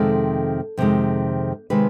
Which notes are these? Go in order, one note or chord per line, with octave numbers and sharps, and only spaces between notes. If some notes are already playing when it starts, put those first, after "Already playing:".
Already playing: F2 C3 D#3 G#3 A4
F2 C3 D#3 G#3
C3 D#3 G#3 B4